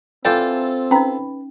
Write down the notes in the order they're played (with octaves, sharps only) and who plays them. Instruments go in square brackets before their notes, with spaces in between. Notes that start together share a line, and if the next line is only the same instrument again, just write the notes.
[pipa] D3 E3 G5 [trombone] C4 [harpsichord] F4 A4 A5 [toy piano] D5
[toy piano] C#4 D#4 [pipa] B4 A#5 B5